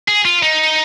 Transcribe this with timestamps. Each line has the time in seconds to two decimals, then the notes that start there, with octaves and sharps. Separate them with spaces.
0.08 G#4
0.25 F4
0.43 D#4